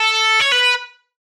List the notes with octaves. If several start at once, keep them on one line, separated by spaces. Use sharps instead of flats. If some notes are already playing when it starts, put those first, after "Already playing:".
Already playing: A4
C#5
B4